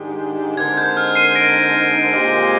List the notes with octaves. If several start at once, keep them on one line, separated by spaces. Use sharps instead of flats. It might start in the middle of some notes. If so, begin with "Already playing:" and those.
Already playing: G#2 D#3 G#3 D4 G4
D3 G#3 C4 D#4 A#4 G#6
G6
F6
C7 D#7
A#6 D7
A#2 G#3 C4 G4